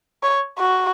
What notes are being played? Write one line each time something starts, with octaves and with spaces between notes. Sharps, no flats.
C#5
F#4